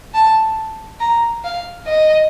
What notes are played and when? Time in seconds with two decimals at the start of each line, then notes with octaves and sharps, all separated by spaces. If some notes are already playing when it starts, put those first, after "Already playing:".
0.14 A5
1.00 A#5
1.44 F5
1.87 D#5